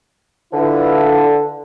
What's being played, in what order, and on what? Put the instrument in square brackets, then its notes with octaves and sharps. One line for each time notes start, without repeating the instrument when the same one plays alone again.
[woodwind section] D3 [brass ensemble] E4 F4 B4